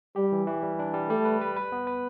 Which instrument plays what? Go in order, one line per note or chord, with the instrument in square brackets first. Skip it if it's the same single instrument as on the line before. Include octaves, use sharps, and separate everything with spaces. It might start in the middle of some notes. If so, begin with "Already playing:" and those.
[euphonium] G3 [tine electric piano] G4
[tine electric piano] E3
E3
G3
D4
G3
[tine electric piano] G3 [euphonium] A3
[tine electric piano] B4
B4
B4
B3
B4